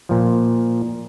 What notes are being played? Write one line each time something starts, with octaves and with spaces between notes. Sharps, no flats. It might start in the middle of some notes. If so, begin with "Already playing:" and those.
A#2 F3